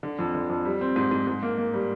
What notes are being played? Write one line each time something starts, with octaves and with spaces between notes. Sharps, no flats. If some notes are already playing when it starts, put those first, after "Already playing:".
D3
F2
D3
F2
G3
C4
G#2
G#2
G#2
A#3
A#3
G3